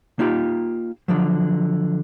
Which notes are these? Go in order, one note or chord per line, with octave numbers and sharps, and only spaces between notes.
A#3 D#4 F4 G4
D3 F3 F#3